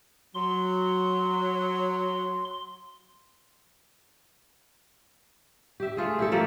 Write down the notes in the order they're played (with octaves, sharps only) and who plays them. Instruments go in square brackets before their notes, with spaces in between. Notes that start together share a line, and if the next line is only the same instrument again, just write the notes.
[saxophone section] F#3 [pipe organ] C6
[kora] G4 E5
A3 F4 G#4
E4 G4 A4
F3 A3 A#3 G4